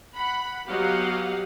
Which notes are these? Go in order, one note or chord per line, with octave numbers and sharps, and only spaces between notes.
F#5 B5
F#3 B3 G4 D#5 F5 F#5